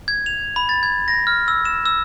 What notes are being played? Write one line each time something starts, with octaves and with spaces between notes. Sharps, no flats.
G#6
F7
B5
A6
G#6
A#6
F6
E6
E7
E6